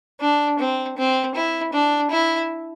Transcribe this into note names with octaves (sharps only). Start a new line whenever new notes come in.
D4
C4
C4
E4
D4
E4